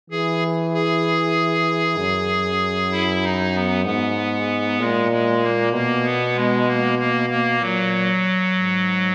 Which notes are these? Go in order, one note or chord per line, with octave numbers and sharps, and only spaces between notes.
E3 G#4
G#4
F#2
E4
D#4
B3
G#2 B3
A#2 G#3
G#3
A#3
B2 A#3
B3
G#3
A#3
A#3
A#3
A#2 F#3
G#2